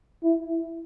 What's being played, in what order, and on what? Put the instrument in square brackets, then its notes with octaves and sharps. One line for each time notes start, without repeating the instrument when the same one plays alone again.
[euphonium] E4